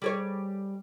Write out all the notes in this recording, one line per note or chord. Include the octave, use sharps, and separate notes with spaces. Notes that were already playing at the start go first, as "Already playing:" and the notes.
G3 G#4 C#5